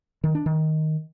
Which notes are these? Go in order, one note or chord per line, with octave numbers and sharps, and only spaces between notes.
D#3
D4
D#3